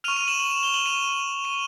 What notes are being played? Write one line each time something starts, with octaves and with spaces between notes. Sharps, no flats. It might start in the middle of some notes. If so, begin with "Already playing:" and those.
C#6 F6 D#7 F7
D#7 F7
E7 F#7
E7 F#7
E7 F#7
F7 G7
E7 F#7
D#7 F7
D#7 F7